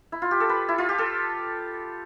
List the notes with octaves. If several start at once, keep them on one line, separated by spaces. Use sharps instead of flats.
E4
F4
G4
A4
B4
E4
F4
G4
A4